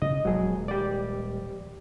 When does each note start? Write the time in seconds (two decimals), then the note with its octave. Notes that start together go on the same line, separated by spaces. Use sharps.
0.02 C#3 D#5
0.25 D#1 F3 F#3 G#3 G#4
0.68 G4 D5